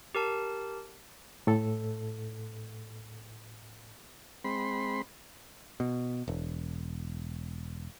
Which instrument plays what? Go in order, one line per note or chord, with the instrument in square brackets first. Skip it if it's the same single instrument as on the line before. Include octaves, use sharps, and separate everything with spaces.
[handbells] G4 A#4 A5
[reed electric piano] A2 A4
[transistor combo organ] G#3 C4 B5 C6
[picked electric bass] B2
E1